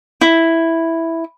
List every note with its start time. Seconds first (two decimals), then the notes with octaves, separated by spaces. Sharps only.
0.21 E4